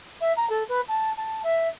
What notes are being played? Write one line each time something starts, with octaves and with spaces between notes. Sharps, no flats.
E5
A#5
A4
B4
A5
A5
E5